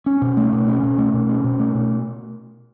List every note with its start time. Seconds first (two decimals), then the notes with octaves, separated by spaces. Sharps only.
0.06 C#4
0.22 B2
0.37 A3
0.53 B2
0.68 C#4
0.83 B2
0.98 A3
1.14 B2
1.29 C#4
1.44 B2
1.59 A3
1.75 B2